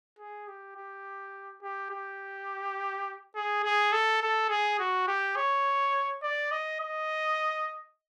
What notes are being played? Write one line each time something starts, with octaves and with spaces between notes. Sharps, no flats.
G#4
G4
G4
G4
G4
G#4
G#4
A4
A4
G#4
F#4
G4
C#5
D5
D#5
D#5